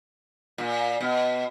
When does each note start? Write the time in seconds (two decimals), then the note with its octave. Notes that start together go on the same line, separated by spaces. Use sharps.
0.58 A#2
1.01 B2